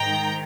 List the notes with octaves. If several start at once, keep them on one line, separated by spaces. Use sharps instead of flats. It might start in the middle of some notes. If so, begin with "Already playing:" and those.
Already playing: G#2 D#3 G5 A#5